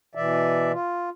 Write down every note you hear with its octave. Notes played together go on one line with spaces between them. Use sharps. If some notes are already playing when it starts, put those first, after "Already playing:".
B2 E3 D5 E5
F4